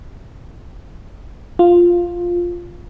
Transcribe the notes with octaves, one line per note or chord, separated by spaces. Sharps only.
F4